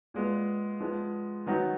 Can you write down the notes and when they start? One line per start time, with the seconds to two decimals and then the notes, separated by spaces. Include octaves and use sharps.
0.14 A#2 G#3 B3
0.80 F3 G#3 B3
1.46 D#3 F#3 B3 D#4 F#4